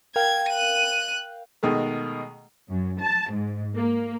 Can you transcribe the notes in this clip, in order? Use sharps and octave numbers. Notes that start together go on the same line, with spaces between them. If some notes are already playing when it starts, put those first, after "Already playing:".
A#4 F5 G5 G#6
F#6 D#7
B2 D#3 G#3 A3
F#2
A5
G#2
A#3